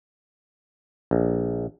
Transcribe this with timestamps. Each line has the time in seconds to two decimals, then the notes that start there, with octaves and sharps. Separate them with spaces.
1.11 A#1